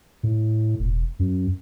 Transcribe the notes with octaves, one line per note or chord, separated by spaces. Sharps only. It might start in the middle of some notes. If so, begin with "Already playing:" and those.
A2
E1
F#2